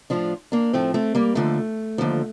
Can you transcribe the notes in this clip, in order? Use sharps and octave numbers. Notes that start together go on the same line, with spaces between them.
A2 F3 D4 F4
A#3 D4
A2 F3 A3 C4
A3 C4
G3 A#3
D#2 D3 F3 A3
D#2 D3 F3